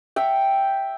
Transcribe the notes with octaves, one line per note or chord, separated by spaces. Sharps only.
E5 G5